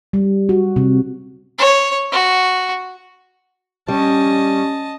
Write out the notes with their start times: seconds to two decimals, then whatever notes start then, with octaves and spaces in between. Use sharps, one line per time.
0.13 G3
0.49 F#4
0.76 C3
1.59 C#5
2.12 F#4
3.88 G3 C#4 D#5 A5